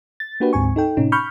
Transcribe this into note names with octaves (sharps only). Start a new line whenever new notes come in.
A6
A#3 D4 F#4 G4 B4
D2 G#2 C4 G#5 C#6
D#4 A4 G5
A2 C3 C#4 D#4
B5 C#6 F6 G6